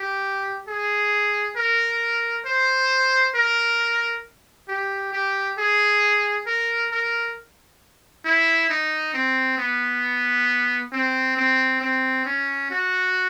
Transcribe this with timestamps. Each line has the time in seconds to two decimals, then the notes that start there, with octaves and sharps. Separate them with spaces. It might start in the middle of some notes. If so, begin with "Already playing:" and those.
Already playing: G4
0.68 G#4
1.57 A#4
2.46 C5
3.35 A#4
4.68 G4
5.13 G4
5.58 G#4
6.47 A#4
6.92 A#4
8.25 E4
8.70 D#4
9.14 C4
9.58 B3
10.92 C4
11.37 C4
11.81 C4
12.26 C#4
12.71 F#4